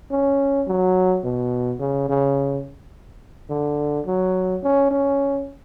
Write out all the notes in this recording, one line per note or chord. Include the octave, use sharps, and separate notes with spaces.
C#4
F#3
B2
C#3
C#3
D3
F#3
C#4
C#4